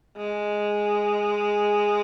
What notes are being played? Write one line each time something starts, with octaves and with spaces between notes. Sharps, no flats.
G#3